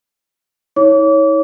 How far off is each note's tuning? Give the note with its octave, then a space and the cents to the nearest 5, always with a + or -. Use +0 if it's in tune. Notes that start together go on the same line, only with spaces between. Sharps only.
E4 -45 C#5 +0 D6 -35